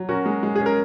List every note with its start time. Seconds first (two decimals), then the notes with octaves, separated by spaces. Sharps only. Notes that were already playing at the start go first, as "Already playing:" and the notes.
Already playing: F#3
0.09 C#4 F#4 A#4
0.26 G#3
0.43 G#3
0.55 G#4
0.61 C#4
0.66 A#4